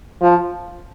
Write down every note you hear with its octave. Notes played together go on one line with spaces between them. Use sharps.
F3